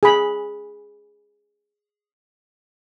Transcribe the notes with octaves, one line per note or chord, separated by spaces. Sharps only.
G#4 B5